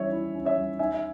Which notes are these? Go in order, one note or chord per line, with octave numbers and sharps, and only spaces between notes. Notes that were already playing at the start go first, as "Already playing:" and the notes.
Already playing: E3 G3 C#4 C#5 E5
E4
C#4
C#5 E5
G3
D#4 E5 G#5
E5